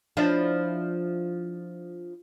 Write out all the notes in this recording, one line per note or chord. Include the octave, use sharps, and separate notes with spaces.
F3 D4 E4